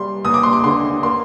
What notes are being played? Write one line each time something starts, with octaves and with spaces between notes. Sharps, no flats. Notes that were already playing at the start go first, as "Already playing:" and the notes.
Already playing: G3 C6
D#2 D#6
D6
C6
D6
D3 C6
A#3 C6